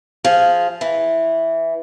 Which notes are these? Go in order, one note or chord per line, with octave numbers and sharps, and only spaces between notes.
F3 G#4
E3